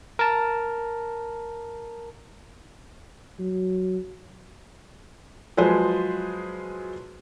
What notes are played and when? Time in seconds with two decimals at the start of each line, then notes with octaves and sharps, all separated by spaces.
0.19 A#4 A5
3.39 F#3
5.57 F3 F#3 G#3 G#4 B4 C5